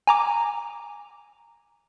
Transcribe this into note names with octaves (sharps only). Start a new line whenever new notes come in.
G#5 A#5 D6